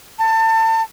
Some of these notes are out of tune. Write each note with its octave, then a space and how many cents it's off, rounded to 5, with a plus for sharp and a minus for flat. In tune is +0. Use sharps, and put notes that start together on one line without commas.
A5 +30